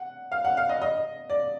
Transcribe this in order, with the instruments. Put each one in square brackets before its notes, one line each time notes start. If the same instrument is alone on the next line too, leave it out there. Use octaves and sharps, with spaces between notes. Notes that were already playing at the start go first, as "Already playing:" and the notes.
Already playing: [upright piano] F#5
F5
F#5
F5
D#5
D#5
D5